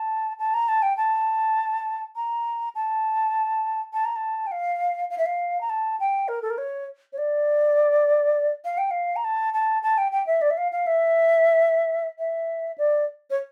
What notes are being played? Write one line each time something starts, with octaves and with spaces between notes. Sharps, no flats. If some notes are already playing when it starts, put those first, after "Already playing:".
Already playing: A5
A5
A#5
A5
G5
A5
A#5
A5
A5
A#5
A5
G5
F5
F5
E5
F5
A#5
A5
G5
A#4
A4
A#4
C#5
C#5
D5
F5
G5
F5
A#5
A5
A5
A5
G5
G5
E5
D5
E5
F5
F5
E5
E5
D5
C#5